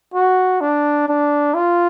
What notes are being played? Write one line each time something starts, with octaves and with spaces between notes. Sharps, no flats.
F#4
D4
D4
F4